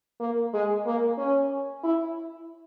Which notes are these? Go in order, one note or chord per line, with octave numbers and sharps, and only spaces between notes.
A#3
G#3
A#3
C#4
E4